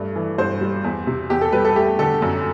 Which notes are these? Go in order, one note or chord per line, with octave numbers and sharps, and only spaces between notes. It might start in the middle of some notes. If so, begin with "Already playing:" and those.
Already playing: G2 A3
E3
G2 C5
G3
E2
C3
E2 G4
A4
G3 B4
A4
A3 G4
D3 A4
F#2